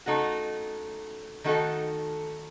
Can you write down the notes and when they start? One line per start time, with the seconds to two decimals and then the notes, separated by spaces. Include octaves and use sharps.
0.06 C#3 A3 D#4 F#4
1.44 D#3 A3 D#4 F#4 A4